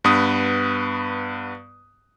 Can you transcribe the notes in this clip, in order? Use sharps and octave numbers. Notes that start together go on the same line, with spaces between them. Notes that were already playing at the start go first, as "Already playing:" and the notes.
G2 B3 B4 D#6